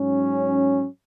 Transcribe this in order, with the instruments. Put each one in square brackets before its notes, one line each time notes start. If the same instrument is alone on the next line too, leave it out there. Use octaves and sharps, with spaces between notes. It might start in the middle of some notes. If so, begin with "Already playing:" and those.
Already playing: [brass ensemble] G#2 F#3 C#4